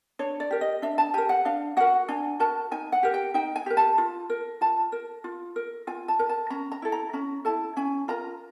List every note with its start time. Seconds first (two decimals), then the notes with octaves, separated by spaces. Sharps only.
0.19 D4 C#5
0.40 D5
0.51 G4 A#4
0.61 D#5
0.82 D4 E5
0.98 A5
1.14 G4 A#4 G#5
1.29 F#5
1.45 D4 F5
1.77 F#4 A#4 F#5
2.08 D4 G#5
2.40 F#4 A#4 A5
2.71 D#4 G#5
2.92 F#5
3.03 G4 A#4
3.14 G5
3.34 D#4 G5
3.56 G#5
3.66 G4 A#4
3.77 A5
3.98 F4
4.30 A#4
4.61 F4 A5
4.92 A#4
5.24 F4
5.56 A#4
5.87 F4 G#5
6.08 A5
6.19 A#4
6.29 A5
6.50 C#4 A#5
6.72 A#5
6.82 E4 A4
6.92 A#5
7.13 C#4 A#5
7.45 E4 A4 A5
7.77 C#4 G#5
8.08 F4 A#4 A#5